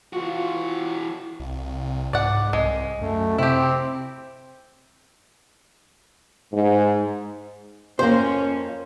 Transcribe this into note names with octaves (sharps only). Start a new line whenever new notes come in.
E3 F4 F#4
C2
G#2 D5 F#5
C2 G#3
F#2 A3
C3 C4 E4 G4
G#2
F2 A#3 C#4 C5